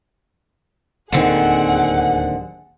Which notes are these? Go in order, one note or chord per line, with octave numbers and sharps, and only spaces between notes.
D1 D#2 D3 D#3 C4 G#4 F#5